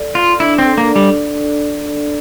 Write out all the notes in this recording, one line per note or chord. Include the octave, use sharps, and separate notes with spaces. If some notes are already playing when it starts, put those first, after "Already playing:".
Already playing: A4 D5
F4 D5
D4 E4
C4
A4
A#3
D5
G3